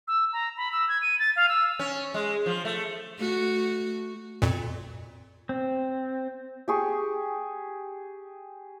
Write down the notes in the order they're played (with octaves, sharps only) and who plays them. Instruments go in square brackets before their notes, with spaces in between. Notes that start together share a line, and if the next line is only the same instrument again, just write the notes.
[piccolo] E6
A#5
B5
E6
G#6
D#7
A6
F5
E6
[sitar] C#4
G#3
F3
A3
[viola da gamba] A3 F#4
[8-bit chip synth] F2 A#2
[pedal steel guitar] C4
[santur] G4 G#4 C#6